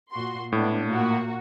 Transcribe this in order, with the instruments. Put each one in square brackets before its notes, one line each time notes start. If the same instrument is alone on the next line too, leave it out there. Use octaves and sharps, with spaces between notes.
[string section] A#2 F#4 C6
[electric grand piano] A2 [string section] G#3 B3 D4
[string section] A#2 A#3 F#4